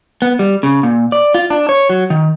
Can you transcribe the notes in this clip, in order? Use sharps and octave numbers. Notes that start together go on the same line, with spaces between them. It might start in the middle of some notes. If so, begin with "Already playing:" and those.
B3
G3
C#3
A#2
D5
F4
D4
C#5
F#3
D#3